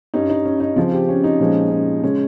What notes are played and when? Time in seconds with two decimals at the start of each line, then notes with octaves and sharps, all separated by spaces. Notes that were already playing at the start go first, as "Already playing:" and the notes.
0.14 G2 G3 C#4 D#4
0.30 D#4
0.45 C#4
0.60 D#4
0.76 C#3 F3 C4 F4
0.93 G4
1.09 C#4
1.24 D#4
1.39 A#2 F3 G#3 C#4
1.71 C#4
2.03 C#3 G#3 C#4